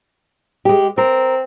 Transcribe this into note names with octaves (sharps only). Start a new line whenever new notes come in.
G#3 G4
C4 A#4